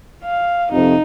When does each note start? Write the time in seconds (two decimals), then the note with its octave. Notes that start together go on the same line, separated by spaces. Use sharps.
0.24 F5
0.72 F2 C3 D#4